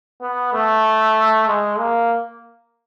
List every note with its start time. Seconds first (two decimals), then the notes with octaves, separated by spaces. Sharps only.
0.22 B3
0.53 A3
1.48 G#3
1.79 A#3